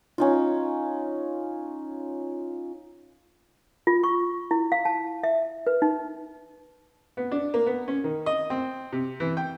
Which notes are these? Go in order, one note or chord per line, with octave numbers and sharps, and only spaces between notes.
C#4 D#4 F4
F4
C#6
E4
F5
A5
E5
B4
D#4
B3
D4
A#3
B3
C#4
D#3
D#5
C4
C3
E3
G5